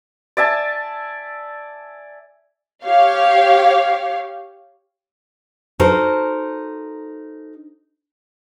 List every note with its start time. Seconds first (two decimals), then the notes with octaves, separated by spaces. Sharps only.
0.37 D5 E5 G#5 A5
2.85 G4 C#5 F5
5.79 D#4 F#4 A4 A#4 C5